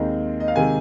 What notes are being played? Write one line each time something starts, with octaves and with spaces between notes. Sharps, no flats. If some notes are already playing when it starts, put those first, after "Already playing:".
Already playing: D#2 D#3 G#3 C4 D#4
D#5
F5
C3 D#3 G#3 G#5